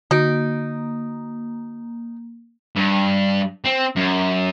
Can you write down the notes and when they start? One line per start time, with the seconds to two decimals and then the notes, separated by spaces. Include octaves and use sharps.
0.11 D3 A#3 D#4 F#4 D7
2.76 G2
3.64 C4
3.96 F#2